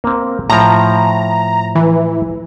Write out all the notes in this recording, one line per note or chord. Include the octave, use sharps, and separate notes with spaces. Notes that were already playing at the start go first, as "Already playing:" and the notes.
A#3 C4
A2 F3 A#5
E3